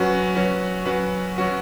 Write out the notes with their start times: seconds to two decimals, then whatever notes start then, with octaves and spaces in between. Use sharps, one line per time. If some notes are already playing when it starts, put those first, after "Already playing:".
Already playing: F#3 C#4 F#4 B4
0.35 F#3 C#4 F#4 B4
0.86 F#3 C#4 F#4 B4
1.36 F#3 C#4 F#4 B4